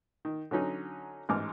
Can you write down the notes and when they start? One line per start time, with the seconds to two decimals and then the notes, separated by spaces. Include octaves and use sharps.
0.25 D#3
0.51 D3 F#3 C#4 D#4
1.29 A1 G#2 D6 F6